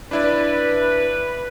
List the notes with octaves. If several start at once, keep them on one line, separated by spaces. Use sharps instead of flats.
D4 E4 B4 D5